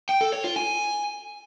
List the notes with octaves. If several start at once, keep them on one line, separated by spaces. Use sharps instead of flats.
G5
A4
C#5
F4
G#5